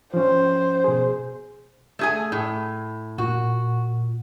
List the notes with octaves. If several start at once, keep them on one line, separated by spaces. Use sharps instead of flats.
F3 C#4 C5
B2 G#4
A3 G#4 G#5
A2
A#2 F#4